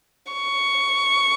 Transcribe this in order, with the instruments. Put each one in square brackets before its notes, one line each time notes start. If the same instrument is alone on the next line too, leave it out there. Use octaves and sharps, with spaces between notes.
[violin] C#6